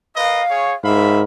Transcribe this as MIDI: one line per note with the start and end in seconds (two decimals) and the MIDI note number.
0.16 0.42 70
0.16 0.42 71
0.16 0.42 75
0.16 0.74 77
0.50 0.74 68
0.50 0.74 73
0.84 1.23 44
0.84 1.23 70
0.84 1.22 76
0.84 1.22 77
0.84 1.22 83